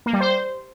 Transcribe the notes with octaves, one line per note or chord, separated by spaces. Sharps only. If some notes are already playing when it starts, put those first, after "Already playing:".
A#3
G3
C5